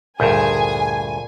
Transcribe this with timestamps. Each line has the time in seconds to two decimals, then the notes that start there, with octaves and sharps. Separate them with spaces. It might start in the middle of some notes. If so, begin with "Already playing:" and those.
0.20 D2 G2 A#2 G#4 G#5 G6